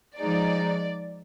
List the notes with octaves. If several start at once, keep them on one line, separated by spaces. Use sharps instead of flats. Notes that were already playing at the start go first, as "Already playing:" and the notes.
F3 G#3 D#4 D5